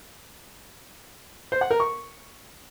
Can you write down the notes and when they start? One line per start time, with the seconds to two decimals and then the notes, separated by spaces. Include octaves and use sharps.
1.52 C5
1.61 F#5
1.71 A#4
1.80 C#6